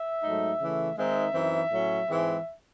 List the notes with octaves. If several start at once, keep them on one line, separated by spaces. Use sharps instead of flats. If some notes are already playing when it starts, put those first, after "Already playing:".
Already playing: E5
G#2 F#3 A3 D#4
C#3 E3 A3
D#3 G#3 C4 D#4 E5
F#2 E3 C4 D#4
A2 F#3 C#4
G#2 E3 G#3 C4